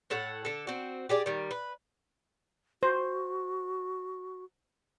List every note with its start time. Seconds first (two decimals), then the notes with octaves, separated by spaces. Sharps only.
0.10 A2 A4 C#5 F#5
0.45 D3 A4
0.67 C4 F#4
1.09 G4 G#4 D5
1.26 D#3 G3
1.51 B4
2.83 F#4 C5